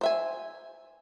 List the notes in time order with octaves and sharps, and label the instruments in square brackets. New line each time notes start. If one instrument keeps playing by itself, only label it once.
[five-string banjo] C5 E5 G#5